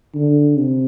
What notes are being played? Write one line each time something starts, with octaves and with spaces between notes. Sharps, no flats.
D3
C3